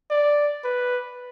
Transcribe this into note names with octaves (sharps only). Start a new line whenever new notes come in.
D5
B4